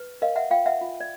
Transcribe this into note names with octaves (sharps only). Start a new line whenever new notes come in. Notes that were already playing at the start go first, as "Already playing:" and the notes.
Already playing: B4
A#4 D#5 F5
E5 F#5
F4 F5 G5
E5 F#5
F4
D5